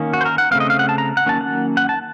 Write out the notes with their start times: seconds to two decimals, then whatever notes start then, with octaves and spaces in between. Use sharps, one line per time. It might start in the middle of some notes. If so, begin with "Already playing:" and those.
Already playing: D#3 A#3 C#4
0.13 F#4
0.21 C5
0.25 A#4
0.38 F#5
0.51 C#3 A3 C4 F5
0.60 D#5
0.70 F5
0.79 F#5
0.89 A5
0.98 A#5
1.17 F#5
1.26 D#3 F#3 A#3 C#4 A5
1.41 F#5
1.77 F#5
1.89 A5